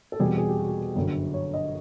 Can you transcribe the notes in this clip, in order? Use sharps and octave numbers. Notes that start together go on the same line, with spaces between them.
A4
E2 B2 G3 C4 G#4
G#4
G4
F#4
G4
G1 F#2 D3
C#5
D#5